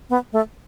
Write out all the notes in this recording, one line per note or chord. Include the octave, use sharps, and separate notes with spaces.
B3
A3